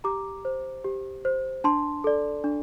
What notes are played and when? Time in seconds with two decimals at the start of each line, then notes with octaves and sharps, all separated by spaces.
0.04 G4 A#5 D6
0.45 C5
0.84 G4
1.25 C5
1.64 D4 A5 C6
2.04 A4 D5
2.44 D4